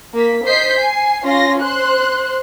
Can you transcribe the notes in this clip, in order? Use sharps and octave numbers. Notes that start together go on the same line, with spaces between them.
A#3 B6
C5 D#5 G6 B6 C7
G#5 C7
C#4 F4 C6 A#6
C5 C6 F#6